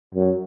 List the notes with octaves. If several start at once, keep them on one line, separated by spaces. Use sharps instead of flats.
F#2